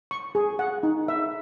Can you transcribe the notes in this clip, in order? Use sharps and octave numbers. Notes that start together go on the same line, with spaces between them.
C#6
G#4
F#5
D#4
E5